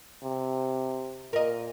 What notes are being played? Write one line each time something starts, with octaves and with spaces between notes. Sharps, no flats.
C3
A#2 A#4 D#5